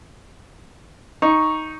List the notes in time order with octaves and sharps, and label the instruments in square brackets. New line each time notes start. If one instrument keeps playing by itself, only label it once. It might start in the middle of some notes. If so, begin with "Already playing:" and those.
[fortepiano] D#4 [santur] C#6